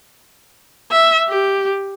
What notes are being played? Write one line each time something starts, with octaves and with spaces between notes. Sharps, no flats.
E5
G4